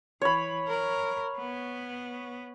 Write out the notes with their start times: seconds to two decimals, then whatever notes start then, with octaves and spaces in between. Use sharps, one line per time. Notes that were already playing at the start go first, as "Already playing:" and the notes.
0.22 E3 C#5 B5
0.68 A#4
1.37 B3